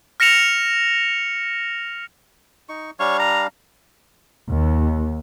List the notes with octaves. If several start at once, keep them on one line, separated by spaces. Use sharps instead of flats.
F6 A#6 C#7 E7 F7
D#4 C#6
G3 D4 C#5 F5
A#5
D#2